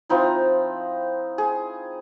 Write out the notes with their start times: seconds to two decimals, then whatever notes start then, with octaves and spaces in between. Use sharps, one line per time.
0.10 F3 C4 D#4 E4
1.38 G#4